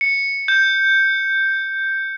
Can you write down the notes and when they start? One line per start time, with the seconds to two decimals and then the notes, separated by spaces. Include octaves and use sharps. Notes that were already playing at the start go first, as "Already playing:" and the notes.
0.01 C#7
0.48 G6